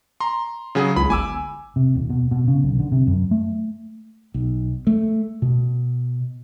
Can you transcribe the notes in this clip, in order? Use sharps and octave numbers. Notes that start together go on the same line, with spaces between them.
A#5 C6
C#3 F#3 G#4
C#2 B5
G1 G#5 D6 E6
C3
D#1
B2
B2
C#3
B1
D3
C3
F#2
A3
B1
A3
B2